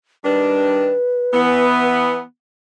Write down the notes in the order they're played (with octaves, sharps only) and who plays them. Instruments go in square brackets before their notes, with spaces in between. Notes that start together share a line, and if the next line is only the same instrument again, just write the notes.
[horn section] D#3 G3 D4 [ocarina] B4
[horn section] E3 B3